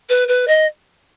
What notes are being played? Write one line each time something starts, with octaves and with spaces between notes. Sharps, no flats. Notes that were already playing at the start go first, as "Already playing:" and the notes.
B4
B4
D#5